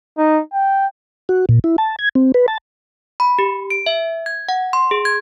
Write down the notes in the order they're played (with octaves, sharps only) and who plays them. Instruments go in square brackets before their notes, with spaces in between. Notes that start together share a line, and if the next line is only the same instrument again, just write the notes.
[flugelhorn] D#4
G5
[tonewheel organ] F#4
A#2
E4
A5
G#6
C4
B4
A5
[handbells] B5
G4
D7
E5
G#6
F#5
C6
G#4
G#6